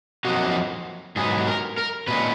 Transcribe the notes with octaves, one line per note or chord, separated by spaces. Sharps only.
F2 D#3 F#3 A#3 D#4 F#4
G#2 F#3 B3 G#4
A#4
A#4
A#2 G#3 C#4 B4